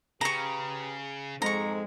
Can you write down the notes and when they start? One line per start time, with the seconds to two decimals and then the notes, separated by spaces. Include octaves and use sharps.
0.21 C#3 G4 G#4 B4 A#5 C#6
1.42 F2 G#2 G#3 A#5 C#6